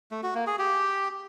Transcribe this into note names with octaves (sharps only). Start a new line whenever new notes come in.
A3
F#4
A#3
G#4
G4